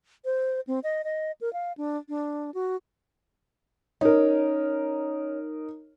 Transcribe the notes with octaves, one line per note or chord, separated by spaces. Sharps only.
C5
C4
D#5
D#5
A#4
F5
D4
D4
F#4
C#4 D#4 A#4